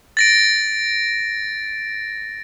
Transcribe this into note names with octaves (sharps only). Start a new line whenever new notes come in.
A6 A#6 D7